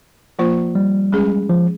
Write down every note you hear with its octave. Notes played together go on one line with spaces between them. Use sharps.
F3 A#3 F4 C5
G3
G#3 C#4 G#4
F3